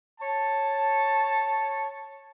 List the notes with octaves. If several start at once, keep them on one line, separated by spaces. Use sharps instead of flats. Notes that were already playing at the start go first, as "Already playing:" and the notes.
C#5 A5